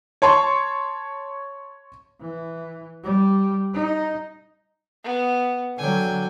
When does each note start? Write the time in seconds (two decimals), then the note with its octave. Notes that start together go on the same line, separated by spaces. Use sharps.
0.22 C#5 A5 C6 C#6
2.20 E3
3.04 G3
3.73 D#4
5.04 B3
5.78 D3 F#3 G5 G#5